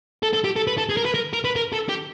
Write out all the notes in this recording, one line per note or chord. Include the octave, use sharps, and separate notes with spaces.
A4
A4
G4
A4
B4
A4
G#4
A#4
B4
A#4
A#4
B4
A#4
A4
G4